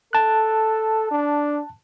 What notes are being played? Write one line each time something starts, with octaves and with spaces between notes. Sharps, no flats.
A4 A5 F#6
D4